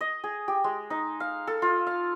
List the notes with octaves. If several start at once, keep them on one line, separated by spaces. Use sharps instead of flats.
D#5
G#4
G4
G#3
D#4
F5
A4
F4
F5